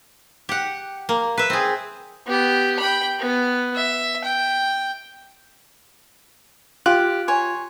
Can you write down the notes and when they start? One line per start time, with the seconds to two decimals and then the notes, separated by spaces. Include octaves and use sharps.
0.49 G4 F#5
1.09 A#3
1.38 B4 E5
1.50 C4 G#4
2.26 B3 G4
2.80 G5 B5
3.19 B3
3.76 E5
4.24 G5
6.86 F4 G4 F#6
7.28 C#5 G#5 C6